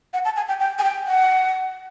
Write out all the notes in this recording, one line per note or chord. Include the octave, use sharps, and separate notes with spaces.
F#5
A5
G#5
G5
G5
G#5
G5
F#5